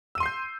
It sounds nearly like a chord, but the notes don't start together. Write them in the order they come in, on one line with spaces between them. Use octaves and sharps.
E6 D#7 C6 C7 G6